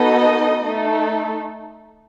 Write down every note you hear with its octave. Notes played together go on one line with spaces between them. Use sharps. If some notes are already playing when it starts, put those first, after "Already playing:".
Already playing: B3 D#4 F#4 A4 D#5
A3 D#4 A4